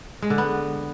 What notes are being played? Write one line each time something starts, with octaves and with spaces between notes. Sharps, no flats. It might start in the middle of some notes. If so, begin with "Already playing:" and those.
G#3
D3
B3